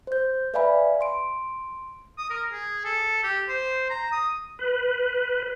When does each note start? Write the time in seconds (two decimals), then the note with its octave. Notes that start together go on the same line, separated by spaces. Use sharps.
0.07 C5 G6
0.54 B4 D5 E5 F5 G#5 B5
1.01 C6 D7
2.18 D#6
2.30 A#4
2.52 G#4
2.84 A4
3.23 G4
3.49 C5
3.90 A#5
4.12 D#6
4.59 B4